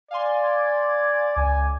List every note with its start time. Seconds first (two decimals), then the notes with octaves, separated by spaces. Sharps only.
0.11 D5 F5 G#5 C6
0.42 D6 G#6
1.36 C#2 G#5